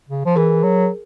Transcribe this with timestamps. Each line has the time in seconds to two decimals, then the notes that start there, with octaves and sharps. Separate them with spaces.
0.09 C#3
0.26 F3
0.36 E3 G#4 A#4
0.63 F#3